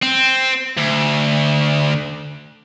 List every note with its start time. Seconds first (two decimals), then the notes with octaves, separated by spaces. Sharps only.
0.02 C4
0.77 D2